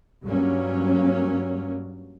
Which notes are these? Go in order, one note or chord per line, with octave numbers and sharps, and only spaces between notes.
G2 F#3 A#3 C#4